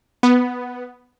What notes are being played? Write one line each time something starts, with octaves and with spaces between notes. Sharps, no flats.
B3